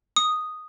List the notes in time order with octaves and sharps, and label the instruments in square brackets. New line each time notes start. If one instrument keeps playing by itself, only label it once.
[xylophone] D#6